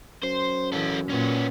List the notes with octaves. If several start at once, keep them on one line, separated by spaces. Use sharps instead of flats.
F#2 C5
E3 C#4 A4
A#2 B3 C#4